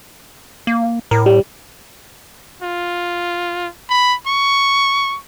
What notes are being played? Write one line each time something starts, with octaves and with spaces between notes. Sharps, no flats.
A#3
A2 A#4
G3
F4
B5
C#6